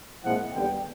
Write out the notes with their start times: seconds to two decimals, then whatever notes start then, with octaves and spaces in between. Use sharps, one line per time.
0.24 A#2 F3 G#3 C4 E4 F#5
0.53 D#2 D3 G3 B3 G5